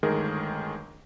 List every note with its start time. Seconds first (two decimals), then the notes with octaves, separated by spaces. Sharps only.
0.03 G1 D#3 G#3 A3 G#4 A#4